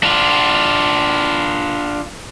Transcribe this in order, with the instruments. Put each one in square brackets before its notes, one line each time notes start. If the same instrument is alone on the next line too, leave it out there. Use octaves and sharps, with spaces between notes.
[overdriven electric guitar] D4 F4